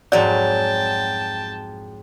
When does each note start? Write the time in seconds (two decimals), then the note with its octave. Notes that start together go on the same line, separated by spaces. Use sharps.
0.12 F2 G#2 F#3 D5 G5 A5